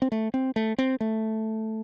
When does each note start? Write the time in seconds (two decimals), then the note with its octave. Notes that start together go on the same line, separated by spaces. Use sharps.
0.02 C4
0.12 A3
0.34 C4
0.56 A3
0.78 C4
1.01 A3